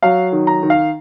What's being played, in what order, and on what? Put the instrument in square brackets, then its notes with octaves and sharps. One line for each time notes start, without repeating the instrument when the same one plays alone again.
[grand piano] F#3 F5
D#3
A#5
D#3
F5